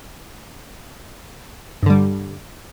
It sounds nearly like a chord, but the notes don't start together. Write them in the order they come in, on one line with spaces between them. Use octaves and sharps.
G2 D3 G3